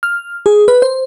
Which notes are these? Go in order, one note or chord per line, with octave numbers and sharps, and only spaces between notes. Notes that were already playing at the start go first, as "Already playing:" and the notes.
F6
G#4
B4
C5